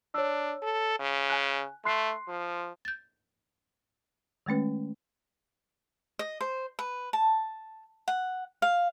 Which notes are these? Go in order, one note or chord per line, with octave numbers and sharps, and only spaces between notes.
D4 C#5 E6
A4
C#3
G#5 F#6
A3 C6 F#6 C7
F3
G6 A6
D#3 G#3 A3 C#4 B4
D#5
C5
B4
A5
F#5
F5